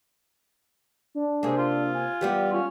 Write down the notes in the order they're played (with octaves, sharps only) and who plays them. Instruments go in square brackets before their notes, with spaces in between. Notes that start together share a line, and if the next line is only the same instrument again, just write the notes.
[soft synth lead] D4
[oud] C3 A#3 [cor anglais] G#4
[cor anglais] F4
[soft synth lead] G#5
[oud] E3 G3 B3 [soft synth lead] G4
[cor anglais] C#4 [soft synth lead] F4